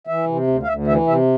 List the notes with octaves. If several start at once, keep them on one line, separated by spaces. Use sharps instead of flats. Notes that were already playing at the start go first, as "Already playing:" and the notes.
E3 E5
C3
D2
F5
D2 E5
E3 E5
C3 E5